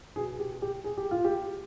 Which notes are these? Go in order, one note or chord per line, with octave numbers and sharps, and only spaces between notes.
B2 G#4
G4
G4
G#4
G4
F4
G4